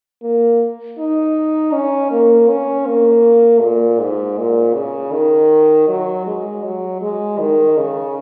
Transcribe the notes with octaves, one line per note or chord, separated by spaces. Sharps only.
A#3
D#4
C#4
A#3
C#4
A#3
A#2
G#2
A#2
C#3
D#3
F#3
G#3
F#3
G#3
D#3
C#3